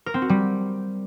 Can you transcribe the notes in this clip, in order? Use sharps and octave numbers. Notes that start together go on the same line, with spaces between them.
A#4
C4
F#4
G3